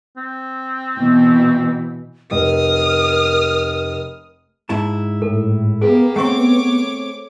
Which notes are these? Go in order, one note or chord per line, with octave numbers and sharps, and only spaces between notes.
C4
B2 E3
F1 A#4 D#6 F6
G#2 E4 A5
A2 A4
A#3 B3 G4 G#4
A3 C4 C#5 F#5 C#6 D6